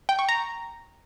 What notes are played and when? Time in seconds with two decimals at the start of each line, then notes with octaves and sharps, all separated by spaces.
0.09 G5
0.19 C#6
0.29 A#5